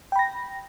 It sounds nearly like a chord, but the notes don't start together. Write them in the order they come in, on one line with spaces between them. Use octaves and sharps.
G5 B5 A#6